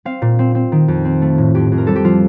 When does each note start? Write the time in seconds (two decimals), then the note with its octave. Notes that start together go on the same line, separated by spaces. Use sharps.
0.05 C4 F5
0.22 A#2
0.39 C4
0.55 C4
0.72 D#3
0.88 F2
1.05 C4
1.22 A3
1.38 A2
1.55 F2 G4
1.72 F2
1.78 A#4
1.87 G3 A4
1.96 G4
2.04 F3 F4